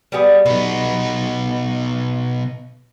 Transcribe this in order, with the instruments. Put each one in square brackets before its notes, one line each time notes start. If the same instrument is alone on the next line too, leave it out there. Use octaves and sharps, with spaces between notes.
[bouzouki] G3 B3 G#4
[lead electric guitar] B2 D#4 [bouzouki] B3